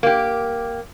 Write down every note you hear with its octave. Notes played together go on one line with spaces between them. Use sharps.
A#3 G4